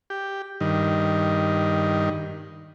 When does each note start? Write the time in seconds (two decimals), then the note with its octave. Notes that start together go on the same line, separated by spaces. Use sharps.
0.10 G4
0.60 G2 D#3